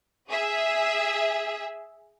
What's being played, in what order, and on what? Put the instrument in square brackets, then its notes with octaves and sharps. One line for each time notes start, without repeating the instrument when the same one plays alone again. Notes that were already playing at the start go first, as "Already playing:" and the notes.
[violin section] G#4 E5